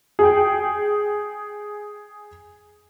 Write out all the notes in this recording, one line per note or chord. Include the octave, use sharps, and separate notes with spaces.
G#4 G5